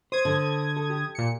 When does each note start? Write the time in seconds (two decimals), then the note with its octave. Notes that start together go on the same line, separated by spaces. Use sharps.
0.12 C5 D#6 G#6
0.25 D3
0.77 A4
0.90 G4
1.15 A#2 C#7